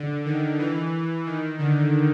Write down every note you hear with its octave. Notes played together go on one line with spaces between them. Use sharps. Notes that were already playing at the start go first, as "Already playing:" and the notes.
Already playing: D3
D#3
E3
D#3
D3